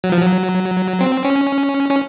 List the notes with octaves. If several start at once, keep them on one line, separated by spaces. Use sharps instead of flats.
F#3
F3
F#3
C4
C#4
C#4